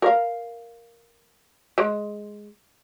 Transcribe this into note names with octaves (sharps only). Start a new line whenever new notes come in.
A#4 F5
G#3